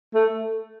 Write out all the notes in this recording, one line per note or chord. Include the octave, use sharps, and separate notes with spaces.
A3